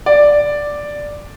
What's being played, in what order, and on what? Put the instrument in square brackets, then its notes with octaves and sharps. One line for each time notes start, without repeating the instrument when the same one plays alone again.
[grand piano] D5